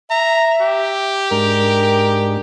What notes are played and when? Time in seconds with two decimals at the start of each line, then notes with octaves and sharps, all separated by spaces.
0.11 E5 A#5
0.61 G4
1.31 G#2 G#3 D4 A#4